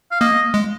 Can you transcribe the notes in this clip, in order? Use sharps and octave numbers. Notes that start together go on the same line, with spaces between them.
F5
A#3 D#5
G#3